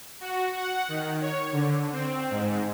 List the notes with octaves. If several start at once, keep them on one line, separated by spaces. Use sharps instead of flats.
F#4
F#5
D#3
C#5
D3
C4
G#2